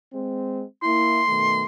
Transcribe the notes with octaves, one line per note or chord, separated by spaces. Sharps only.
G#3 C4
A#3 E4 C6
B2 D#3 A3